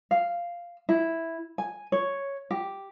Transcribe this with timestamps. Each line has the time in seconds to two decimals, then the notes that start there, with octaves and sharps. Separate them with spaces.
0.11 F5
0.89 E4
1.58 G#5
1.92 C#5
2.51 G4